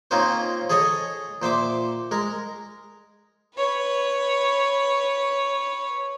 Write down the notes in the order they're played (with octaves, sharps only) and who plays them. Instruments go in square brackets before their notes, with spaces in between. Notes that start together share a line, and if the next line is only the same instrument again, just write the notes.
[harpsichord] A#3 C4 C#4 D#4 F4 C5
G#4 A4 C#5 D#5 G#5
A#2 C5 E5 D6
G#3 A#4
[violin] B4 C#5